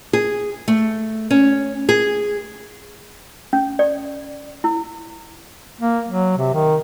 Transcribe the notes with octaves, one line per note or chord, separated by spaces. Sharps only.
G#4
A3
C#4
G#4
C#4
D5
E4
A#3
F#3
C3
D#3